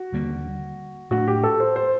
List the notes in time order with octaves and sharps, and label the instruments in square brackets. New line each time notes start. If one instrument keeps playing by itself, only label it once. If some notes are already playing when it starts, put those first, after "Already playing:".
Already playing: [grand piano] F#4
[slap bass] D#2 D3 G3 A#3
[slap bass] A2 A3 D4 [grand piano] F#4
[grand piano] G4
A4
C5
C5